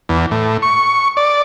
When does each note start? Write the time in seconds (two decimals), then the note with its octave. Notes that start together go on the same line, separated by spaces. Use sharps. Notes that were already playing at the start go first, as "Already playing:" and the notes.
0.09 E2
0.31 A2
0.62 C#6
1.17 D5